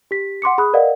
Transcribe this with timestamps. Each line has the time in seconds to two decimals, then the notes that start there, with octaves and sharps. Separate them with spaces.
0.11 G4 B6
0.42 F#5 C6 D6 C#7
0.58 G#4 B5 D#6 F#6
0.73 A#4 B4 D5 D#5 F5 F#5